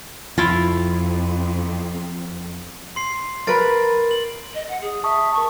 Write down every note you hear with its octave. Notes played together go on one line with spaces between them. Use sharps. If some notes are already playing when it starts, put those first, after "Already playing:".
F2 F3 E4 F4
C6 C7
A#4 B4 A6 D7
F#7
D#5
F#5
G#4
E5 A5 C#6 D#6
A#4 A5 C#6